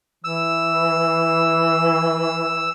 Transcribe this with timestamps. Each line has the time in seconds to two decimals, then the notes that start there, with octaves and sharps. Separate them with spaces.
0.24 E3 E6